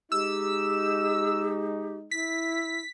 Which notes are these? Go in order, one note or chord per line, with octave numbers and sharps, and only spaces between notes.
G#3 D#4 G4 E6
E4 B6